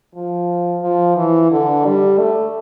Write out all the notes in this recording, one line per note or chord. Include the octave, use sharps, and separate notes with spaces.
F3
F3
E3
D3
G3
A3